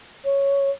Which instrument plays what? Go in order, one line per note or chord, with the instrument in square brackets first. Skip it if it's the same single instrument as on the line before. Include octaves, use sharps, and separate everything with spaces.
[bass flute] C#5